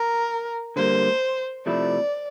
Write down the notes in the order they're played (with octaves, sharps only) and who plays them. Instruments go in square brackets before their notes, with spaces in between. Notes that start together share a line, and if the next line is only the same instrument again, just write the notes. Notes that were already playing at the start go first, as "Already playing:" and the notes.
Already playing: [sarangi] A#4
[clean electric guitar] D3 G3 A#3 [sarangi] C5
[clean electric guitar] C3 F3 A3 E4 [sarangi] D5